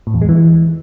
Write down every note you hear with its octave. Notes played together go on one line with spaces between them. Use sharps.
A2
E2
G#3
E3